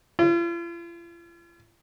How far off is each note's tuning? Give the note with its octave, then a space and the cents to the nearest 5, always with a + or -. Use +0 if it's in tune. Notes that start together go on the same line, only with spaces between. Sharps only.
F4 -45